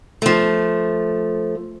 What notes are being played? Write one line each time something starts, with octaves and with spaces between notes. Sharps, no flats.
F3 A3